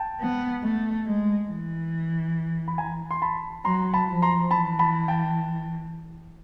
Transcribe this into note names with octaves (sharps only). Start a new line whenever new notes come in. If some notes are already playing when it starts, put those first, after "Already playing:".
Already playing: G5 A5
B3
A3
G#3
E3
B5
G#5 A#5
C6
A5 B5
F#3 A#5 C6
A5 B5
F3
A#5 C6
E3 A5 B5
A5 B5
G5 A5